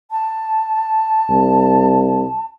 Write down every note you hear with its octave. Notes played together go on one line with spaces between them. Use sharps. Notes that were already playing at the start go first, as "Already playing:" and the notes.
A5
C2